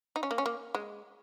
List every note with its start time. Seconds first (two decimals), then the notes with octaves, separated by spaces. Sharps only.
0.16 D#4
0.23 C#4
0.31 A#3
0.38 C#4
0.46 A#3
0.75 G#3